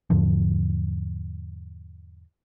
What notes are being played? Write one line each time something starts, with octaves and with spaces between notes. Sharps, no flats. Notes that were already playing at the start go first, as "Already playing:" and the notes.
E2 G#2 D3 F3